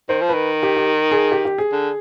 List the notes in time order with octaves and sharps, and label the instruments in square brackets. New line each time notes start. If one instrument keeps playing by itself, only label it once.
[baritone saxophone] D#3 [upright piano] C5
[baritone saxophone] F3
[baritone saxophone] D#3 [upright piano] B4
[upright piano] G4
G4
G#4
G4
G4
G#4
[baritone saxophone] D3